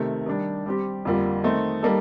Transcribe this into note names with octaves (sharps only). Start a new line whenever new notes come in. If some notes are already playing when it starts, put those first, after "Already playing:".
Already playing: C3 D#3 A3
D#3 G3 D4
G3 C4 G4
F2 D3 G3 A#3 F4
D#3 A3 C4 D#4
G3 A#3 D#4 A4